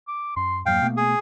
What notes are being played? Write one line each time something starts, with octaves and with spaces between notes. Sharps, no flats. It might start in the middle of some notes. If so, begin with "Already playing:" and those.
D6
F#2 C6
F2 G#2 F#3 A#3 F5 G5
B2 A3 B3
G#4